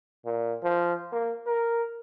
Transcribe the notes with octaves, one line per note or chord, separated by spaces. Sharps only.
A#2
F3
A#3
A#4